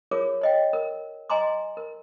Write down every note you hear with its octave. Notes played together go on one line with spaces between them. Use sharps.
F4 G#4 A#4 C#5 D6
C#5 D#5 G5
A#4
D#5 G#5 A#5 C6 D6
A#4